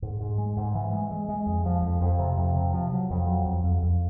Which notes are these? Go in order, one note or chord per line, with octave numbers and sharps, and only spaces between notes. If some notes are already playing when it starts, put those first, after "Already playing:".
G#2
G#2
G#3
G#2
E3
G#3
G#3
G#3
F2
F3
F2
F2
C3
F2
C3
F3
F#3
F2
F#3
F2
F2
F2